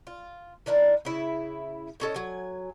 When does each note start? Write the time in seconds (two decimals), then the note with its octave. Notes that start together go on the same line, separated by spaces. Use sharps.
0.07 F4
0.66 D#3 D4 E4 A#4
1.05 C#3 E4
2.00 A2 C#4 A4 D#5
2.14 F#3 G#5